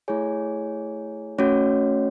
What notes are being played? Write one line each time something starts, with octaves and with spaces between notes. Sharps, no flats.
A3 E4 G#4 C#5 G#5
A3 C#4 F#4 C#5